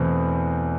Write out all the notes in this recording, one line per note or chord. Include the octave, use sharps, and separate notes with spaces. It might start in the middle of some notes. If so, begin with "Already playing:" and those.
Already playing: E2 B2 A3 C4